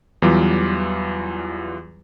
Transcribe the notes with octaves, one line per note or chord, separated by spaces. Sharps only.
E2 E3 F#3 G3 F4 D6